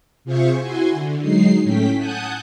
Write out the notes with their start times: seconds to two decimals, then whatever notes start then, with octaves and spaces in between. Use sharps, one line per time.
0.24 C3 F4 G#4 C5 E5 C#6
0.59 E4 F#4 G#5 C6
0.92 D3
1.22 F#3 G#3 D#4 C7
1.63 A2 A3 C#4 G5 B6
1.97 F#5 G#5 A5 D#6 F#6 G6